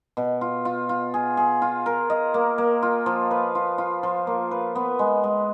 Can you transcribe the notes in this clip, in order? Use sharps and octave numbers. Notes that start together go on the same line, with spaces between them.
B2
F4
F4
F4
G#4
G#4
F4
A#4
D#5
A#3
A#3
F4
F3
B4
F4
F4
F3
A#3
B4
B3
G#3
G#3